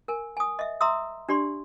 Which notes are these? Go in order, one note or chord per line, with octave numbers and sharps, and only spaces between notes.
A#4 G#5
G#5 D#6
D#5 E5
E5 A#5 C6 D#6 E6
D4 G4 D5 C6